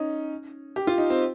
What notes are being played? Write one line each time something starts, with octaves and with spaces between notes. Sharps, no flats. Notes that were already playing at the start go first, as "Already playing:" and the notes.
Already playing: C#4 D#4
G4
F4
D#4
C4